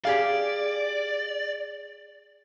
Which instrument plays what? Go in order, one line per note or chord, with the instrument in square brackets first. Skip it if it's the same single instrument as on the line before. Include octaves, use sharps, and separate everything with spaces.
[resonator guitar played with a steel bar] G4 G#4 F5 [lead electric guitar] D5